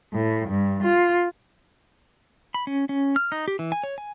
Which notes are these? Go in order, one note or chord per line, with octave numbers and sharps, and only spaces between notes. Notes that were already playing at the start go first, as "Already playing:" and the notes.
A2
G2
F4
B5
C#4
C#4
F6
D#4
G4
E3
G#5
C#5
G#5